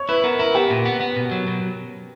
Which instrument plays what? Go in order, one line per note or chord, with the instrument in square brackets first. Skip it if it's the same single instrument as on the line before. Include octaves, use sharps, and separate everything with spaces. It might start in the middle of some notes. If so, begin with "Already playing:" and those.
Already playing: [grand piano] C#5
[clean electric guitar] E4 [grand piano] B4
[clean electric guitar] B3 [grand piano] A#4
[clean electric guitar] E4 [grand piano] A#4
[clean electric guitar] B3 [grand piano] G4
[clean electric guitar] A#2
B3
B3
B2
F#3
B2